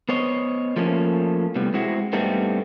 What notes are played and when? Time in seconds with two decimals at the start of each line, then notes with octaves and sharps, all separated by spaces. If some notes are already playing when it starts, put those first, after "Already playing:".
0.09 B3 C5 C#5 D#5
0.76 F3 A3 A#3 C#4
1.55 A2 C3 G3 B3
1.74 G#3 C4 E4 F#4
2.13 G2 G3 A3 B3 C4 D#4